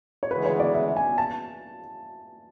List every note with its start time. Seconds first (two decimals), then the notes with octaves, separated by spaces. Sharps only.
0.23 C#5
0.31 D2 C#3 E3 G#3 B3 B4
0.45 C#5
0.60 D5
0.74 E5
0.97 G#5
1.18 A5